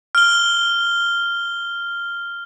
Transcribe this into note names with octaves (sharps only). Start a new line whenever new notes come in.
F6 G7